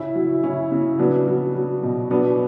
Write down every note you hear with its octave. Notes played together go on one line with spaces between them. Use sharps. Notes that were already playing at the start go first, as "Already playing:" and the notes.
Already playing: C#3 C#4 E4
F#3
C#3 C#4 E4
C#3
F#3 B3 D4
F#3
F#3
B2
F#3 B3 D4